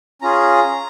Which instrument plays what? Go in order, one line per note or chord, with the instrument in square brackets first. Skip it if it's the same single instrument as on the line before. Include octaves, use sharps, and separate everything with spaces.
[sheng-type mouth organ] C#4 F4 G#4 A#5